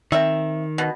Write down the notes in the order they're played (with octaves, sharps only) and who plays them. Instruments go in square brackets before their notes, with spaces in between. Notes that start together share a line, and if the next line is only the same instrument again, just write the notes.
[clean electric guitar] D#3 [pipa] C4 E5
[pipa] B2